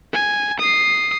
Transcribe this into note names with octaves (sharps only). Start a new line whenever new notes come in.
G#5
D#6 C7